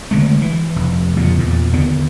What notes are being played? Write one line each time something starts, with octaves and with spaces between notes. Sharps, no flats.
D3 G#3 A3
E3
F1
F2 A#2 C#3
E2 A#2
D#2 D3 B3